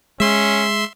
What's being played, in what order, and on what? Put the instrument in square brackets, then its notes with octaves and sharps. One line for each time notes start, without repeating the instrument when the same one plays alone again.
[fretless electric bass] G#3 [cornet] C#4 [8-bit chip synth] E5 C6